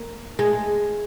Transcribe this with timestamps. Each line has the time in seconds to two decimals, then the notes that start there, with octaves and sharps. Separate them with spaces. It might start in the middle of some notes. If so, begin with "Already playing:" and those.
Already playing: A#3
0.39 G#3